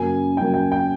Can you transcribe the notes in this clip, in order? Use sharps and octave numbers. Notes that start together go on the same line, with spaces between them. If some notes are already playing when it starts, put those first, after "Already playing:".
Already playing: F#2 C#3 F#3 A#3 G#5
F#2 C#3 F#3 A#3 G5
G5
G5